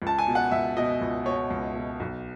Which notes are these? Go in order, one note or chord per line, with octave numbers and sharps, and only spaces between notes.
C#2
A5
G#5
B2
F#5
C#2 E5
B2 D#5
C#2
B2 C#5
C#2
B2
B1